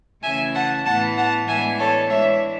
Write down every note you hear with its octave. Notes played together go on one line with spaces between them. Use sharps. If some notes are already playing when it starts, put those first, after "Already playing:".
C#3 E3 A3 E5 G#5
F#5 A5
A2 E3 B3 F#5 A5
F#5 A5
A2 E3 G#3 B3 D4 E5 G#5
A4 C#5
E3 G#3 D4 C#5 E5